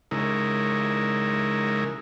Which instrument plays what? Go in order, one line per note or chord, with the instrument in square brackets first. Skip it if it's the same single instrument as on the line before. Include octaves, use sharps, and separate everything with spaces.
[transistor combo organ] C#3 G#3 D#4 E4 A#4